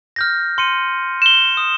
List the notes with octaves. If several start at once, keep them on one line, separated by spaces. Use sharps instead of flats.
F6 G6 A#6
C6 C#7 D#7
E7 G7
D#6